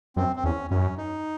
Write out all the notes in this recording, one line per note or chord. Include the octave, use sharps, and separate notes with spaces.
F#2 C4
C4
E2 C#4
F#2 C#4
D#4